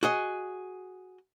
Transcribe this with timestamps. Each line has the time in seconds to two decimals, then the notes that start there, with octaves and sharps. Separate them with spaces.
0.03 F#4 G#4 D#5